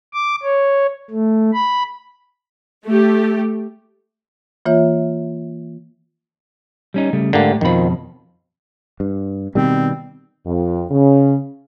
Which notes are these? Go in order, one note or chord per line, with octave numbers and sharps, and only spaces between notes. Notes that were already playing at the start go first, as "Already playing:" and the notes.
D6
C#5
A3
B5
A3 G4
E3 A#3 F4 C#5 E5
G3 C#4 D#4
C#3 G3 A3
G#2 D3 A3 A#3 G4
F2 B2 D#3 F3 B5
G2
B2 D#3 G3 C4
F2
C#3